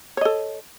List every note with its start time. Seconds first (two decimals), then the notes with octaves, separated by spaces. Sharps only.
0.17 C#5
0.21 D#5
0.25 A4